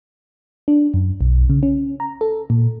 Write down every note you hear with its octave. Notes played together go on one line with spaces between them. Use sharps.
D4
F#2
B1
C#3
C#4
A#5
A4
A#2